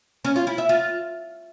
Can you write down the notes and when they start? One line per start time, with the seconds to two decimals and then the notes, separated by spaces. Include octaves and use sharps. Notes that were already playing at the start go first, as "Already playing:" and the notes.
0.25 C#4
0.36 F4
0.47 E4
0.58 E5
0.69 F4